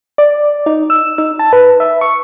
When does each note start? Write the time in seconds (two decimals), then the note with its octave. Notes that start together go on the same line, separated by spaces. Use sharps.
0.18 D5
0.66 D#4
0.90 E6
1.18 D#4
1.39 A5
1.53 B4
1.80 E5
2.01 C#6